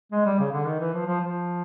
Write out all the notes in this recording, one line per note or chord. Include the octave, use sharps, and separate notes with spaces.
G#3
G3
C#3
D3
D#3
E3
F3
F3
F3